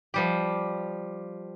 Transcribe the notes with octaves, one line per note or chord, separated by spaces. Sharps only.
F3 G3 G4